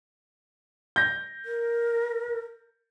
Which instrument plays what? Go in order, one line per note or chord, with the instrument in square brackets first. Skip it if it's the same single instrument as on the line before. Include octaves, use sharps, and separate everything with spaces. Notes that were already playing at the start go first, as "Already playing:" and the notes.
[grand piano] G6 A#6
[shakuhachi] A#4